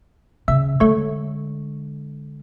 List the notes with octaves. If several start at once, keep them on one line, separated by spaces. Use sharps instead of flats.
C#3 E5
D3 G#3 A3 C#5